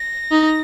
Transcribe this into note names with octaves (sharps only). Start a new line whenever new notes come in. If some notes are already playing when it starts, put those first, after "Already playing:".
Already playing: A#6
D#4